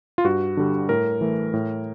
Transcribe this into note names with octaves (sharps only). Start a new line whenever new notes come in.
F4
G2 F#4
D3 G3
A2 A#4
E3 A3
A2